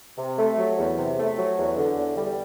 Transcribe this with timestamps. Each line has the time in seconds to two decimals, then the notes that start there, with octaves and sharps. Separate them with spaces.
0.18 C3
0.38 A3
0.58 F#3
0.78 E2
0.98 C3
1.18 A3
1.38 F#3
1.58 E2
1.77 D3
1.97 E2
2.18 G3